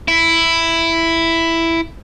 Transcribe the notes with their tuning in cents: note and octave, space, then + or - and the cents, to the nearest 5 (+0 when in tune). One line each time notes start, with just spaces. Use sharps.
E4 +5